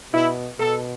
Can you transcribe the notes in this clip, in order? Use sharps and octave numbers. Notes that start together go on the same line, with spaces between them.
B2 E4
B2 A4